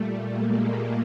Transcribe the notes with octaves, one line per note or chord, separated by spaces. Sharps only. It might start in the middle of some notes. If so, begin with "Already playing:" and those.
Already playing: A#2 G3 A3
G#3 A#3